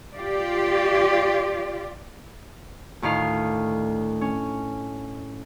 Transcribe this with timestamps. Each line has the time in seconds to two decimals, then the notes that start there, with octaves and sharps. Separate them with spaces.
0.16 F4 G4 D5
3.02 D2 A2 D#3 F5
4.21 C#4